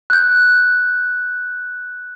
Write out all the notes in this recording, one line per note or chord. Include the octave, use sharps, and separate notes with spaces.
F#6 G6